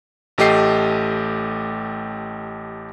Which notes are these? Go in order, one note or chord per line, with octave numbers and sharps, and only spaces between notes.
A1 A3 G4 D#5 C7